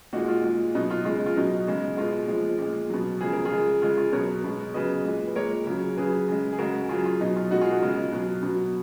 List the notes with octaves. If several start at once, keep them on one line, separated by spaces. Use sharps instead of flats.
A#2 G#3 D#4 F#4
F4
A#2 G#3
B2 F#3 D#4
F4
C#3 G#3 F4
D#4
F4
B2 F#3 D#4
C#3 G#3
B2 G#3 F4
A#2 F3 G#3
A#2 G#3
B2 F#3
C#3 F3 G#3 G#4
A#4
F4 G#4
C#3 G#3
C#3 G#3 F4
F4
B2 F#3 A#4 C#5
B2 G#3
C#3 F#3 B4 D#5
A#2 G#3
B4
A#2 G#3 A#4 C#5
C#3 F#3
C#3 F#3 G#4 B4
C#3 G#3
G#4
C#3 G#3 F#4 A#4
C#3 F#3 F4 G#4
F4
B2 F#3 D#4
F4
B2 G#3 D#4 F#4
F4 G#4
F#4 A#4
C#3 G#3 F4
B2 F#3
B2 F#3